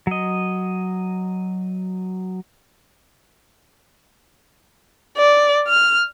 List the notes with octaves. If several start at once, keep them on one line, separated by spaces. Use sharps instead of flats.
F#3 D#5
D5
F6